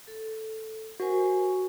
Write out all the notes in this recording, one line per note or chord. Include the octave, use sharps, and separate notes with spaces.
A4
F#4 A#4 C5 G#5